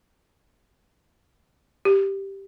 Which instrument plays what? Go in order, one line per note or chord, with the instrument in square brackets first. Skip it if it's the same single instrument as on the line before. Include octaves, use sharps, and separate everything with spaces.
[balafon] G4